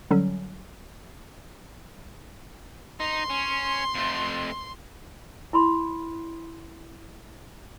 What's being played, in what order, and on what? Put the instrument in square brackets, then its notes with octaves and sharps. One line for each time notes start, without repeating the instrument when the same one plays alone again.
[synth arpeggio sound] D3 F#3 G3 C#4 A4
[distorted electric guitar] D#4 [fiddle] C6
[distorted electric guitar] C#4
F2 A3
[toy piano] E4 B5 C6